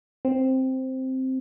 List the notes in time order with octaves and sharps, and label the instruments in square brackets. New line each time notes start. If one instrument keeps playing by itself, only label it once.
[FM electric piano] C4